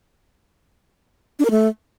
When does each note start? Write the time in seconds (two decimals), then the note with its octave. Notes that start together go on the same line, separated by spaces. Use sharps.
1.39 D4
1.45 A#4
1.51 A3